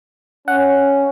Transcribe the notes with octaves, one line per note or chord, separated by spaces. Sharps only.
C#4 F#5